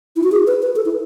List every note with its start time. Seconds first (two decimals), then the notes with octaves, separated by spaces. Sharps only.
0.16 E4
0.23 F#4
0.32 G#4
0.47 B4
0.62 B4
0.76 A4
0.85 E4